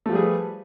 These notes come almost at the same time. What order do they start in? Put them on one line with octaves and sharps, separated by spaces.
A3 F3 G3 G#4 B4